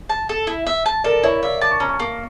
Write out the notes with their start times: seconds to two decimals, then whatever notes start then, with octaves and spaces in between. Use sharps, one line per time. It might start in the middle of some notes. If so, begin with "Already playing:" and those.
0.09 A5
0.29 A4
0.47 E4
0.67 E5
0.86 A5
1.04 A4 A#4 D5
1.23 E4 C#5 E5
1.43 D5 E5 F5
1.61 A5 D6
1.71 C#6
1.80 C#4 A#5
1.89 A5 C#6
2.00 A#3